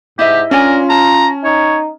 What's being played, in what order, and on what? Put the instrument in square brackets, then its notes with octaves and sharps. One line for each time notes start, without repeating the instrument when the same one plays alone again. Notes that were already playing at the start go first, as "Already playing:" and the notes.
[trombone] G#2 [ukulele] E4 D#5 E5 [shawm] G4
[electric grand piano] C#4 [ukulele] D4 D5 G#5 [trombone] F4 [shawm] A#4
[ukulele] A5 [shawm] A#5
[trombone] D#4 [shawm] C#5